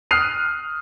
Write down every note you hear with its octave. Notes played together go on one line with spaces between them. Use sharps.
D#6 F6 F#6 C7 D#7 F7